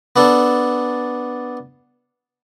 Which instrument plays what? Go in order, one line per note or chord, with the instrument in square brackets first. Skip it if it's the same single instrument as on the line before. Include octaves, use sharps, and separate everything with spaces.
[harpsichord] B3 D4 A4